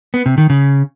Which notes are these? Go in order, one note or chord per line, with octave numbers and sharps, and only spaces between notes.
B3
C3
D#3
C#3